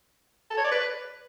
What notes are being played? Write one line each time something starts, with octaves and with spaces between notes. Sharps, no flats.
A4
C#5
D5
B4